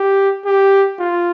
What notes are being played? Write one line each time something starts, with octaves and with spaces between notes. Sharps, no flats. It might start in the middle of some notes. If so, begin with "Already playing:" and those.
Already playing: G4
G4
F4